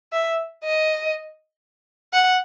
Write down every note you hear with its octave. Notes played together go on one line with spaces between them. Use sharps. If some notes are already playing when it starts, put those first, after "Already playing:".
E5
D#5
F#5